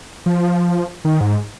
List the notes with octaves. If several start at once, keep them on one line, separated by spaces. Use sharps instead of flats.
F3
D#3
G#2